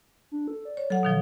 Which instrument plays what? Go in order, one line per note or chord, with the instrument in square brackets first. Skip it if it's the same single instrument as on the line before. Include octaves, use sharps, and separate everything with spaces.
[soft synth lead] D4
A4
D5
[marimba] C#5
[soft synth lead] F#3 [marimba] A4 F#5
[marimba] B2 D#3 F3